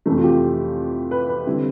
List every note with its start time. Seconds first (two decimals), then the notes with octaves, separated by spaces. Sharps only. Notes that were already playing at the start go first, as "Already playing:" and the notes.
0.06 F2 C3 E3 A3
0.18 F4
0.24 G4
1.11 B4
1.29 B4
1.46 D3 G3 C4 E4